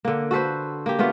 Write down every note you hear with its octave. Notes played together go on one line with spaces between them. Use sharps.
D3 A#3
F#4 A4 B4 C5
A#3 G4
A3 B3 D4 F4